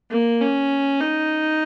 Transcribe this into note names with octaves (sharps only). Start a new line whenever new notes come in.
A#3
C#4
D#4